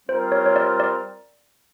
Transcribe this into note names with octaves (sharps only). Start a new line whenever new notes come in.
G3 C4 F4 A#4 C5
C#5
C#5
D5
D5